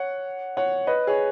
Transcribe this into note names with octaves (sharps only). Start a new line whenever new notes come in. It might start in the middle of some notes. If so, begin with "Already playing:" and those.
Already playing: C#5 F#5
C#5 F#5
B4 D#5
G#4 C#5